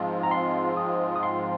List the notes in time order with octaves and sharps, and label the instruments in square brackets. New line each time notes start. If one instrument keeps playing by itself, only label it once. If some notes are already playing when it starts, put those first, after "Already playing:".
Already playing: [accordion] G#2 F3 G#3 C4 F4
[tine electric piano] A#5
C6
D#6
D#6
C6